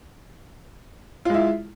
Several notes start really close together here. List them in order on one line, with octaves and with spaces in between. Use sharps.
F4 G#3 E4